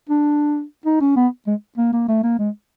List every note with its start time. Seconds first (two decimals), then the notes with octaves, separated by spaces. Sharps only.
0.09 D4
0.86 D#4
1.01 C#4
1.17 B3
1.47 G#3
1.78 A#3
1.93 A#3
2.09 A3
2.24 A#3
2.39 G#3